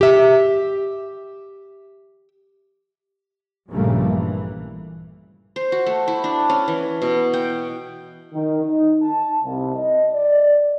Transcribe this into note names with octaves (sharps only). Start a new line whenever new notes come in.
G4 E5
A#1 G2 C#3 G3 A3 A#3
E3
C5
F#4
A3
E4
D4
C#4
E3
B2
G5
D#3
D#4
A5
C2
D#5
D5